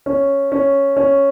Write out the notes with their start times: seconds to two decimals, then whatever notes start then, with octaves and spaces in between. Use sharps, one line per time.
0.06 C#4
0.52 C#4
0.97 C#4